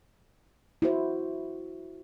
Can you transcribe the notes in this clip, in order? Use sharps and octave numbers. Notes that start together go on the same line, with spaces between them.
E4 F#4 C5